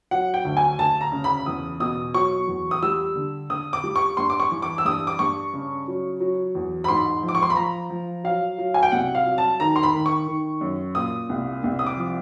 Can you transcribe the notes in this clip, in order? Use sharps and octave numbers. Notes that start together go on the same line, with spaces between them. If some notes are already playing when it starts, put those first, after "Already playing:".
F#3 F#5
G5
D2
G#5
D2 A5
A#5
C#3
B5
E2 D#6
B2 D#6
F#3 C#6
E2
D#6
G3 E6
D3
D3 D#6
D6
G3
C#6
G2 C6
D6
C#6
E3
D6
E6
G2 D#6
D6
G2 C#6
C#3
F#3
F#3
E2
B5
G#2 C6
F3
D6
C#6
C6
B5
F3 A#5
F3
F#3 F5
F#3
G#5
G5
C2 F#5
F5
F#3
A5
D#3 A#5
C6
B5
D#3
C#6
D#3
F#2
A#2 D#6
C2
C2
D#6
D6
F3